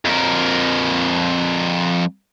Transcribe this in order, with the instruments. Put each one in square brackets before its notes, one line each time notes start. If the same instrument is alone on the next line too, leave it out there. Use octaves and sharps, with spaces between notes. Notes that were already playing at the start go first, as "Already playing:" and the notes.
[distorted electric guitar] F2 A#4